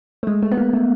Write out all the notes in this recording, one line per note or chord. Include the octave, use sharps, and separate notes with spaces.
A3
G#3
A3
B3
A#3
A3